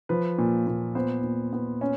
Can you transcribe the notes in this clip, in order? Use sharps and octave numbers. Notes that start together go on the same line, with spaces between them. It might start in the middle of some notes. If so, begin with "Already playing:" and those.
F3 B4
A#2
A#2
B3 C5
A#2
B3
C#4